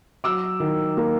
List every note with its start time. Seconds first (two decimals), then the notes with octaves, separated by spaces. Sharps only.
0.24 F#3 D6 E6
0.60 D#3
0.97 A#3